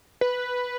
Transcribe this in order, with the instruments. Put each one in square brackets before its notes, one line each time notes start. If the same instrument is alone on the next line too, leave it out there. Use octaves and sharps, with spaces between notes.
[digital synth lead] B4